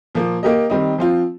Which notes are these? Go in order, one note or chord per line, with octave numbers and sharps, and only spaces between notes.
A#2 F3 A#3
A#3 G4 A#4 D#5
D#3 G3 C4 D#4
F3 C4 F4